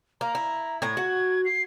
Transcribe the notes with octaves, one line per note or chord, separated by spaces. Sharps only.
A#3 A#5
E4
A2 A#5 G#6
F#4
C7